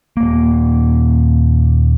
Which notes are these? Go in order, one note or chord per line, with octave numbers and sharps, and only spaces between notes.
D#1 A#3